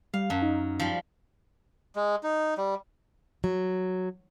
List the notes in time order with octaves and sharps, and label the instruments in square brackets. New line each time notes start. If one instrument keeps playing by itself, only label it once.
[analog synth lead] G3 [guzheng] F5
[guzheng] F#2 [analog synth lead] A5
[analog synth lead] D#4
[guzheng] F3 G3
[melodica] G#3
D#4
G3
[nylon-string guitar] F#3